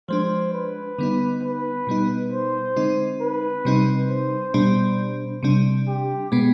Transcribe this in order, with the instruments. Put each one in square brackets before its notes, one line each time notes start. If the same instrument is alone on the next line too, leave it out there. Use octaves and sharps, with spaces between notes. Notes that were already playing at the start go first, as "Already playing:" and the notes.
[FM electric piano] F3 G#3 D4 [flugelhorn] C5
[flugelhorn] B4
[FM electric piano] D3 G3 B3 D#4
[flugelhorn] B4
[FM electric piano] B2 G3 B3 D#4
[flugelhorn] C5
[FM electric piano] D3 G#3 C4 D#4
[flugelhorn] B4
[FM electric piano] C3 G3 C4 D#4
[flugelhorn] C5
[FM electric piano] B2 G3 D4
C3 G3 D4
[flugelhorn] G4
[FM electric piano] B2 G#3 B3